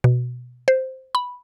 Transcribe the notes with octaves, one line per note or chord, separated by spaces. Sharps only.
B2
C5
B5